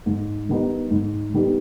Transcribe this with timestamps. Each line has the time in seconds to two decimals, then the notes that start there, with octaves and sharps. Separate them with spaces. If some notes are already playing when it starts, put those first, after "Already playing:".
0.06 G#2
0.49 D#3 G3 B3 D#4
0.91 G#2
1.33 D#3 G3 B3 D#4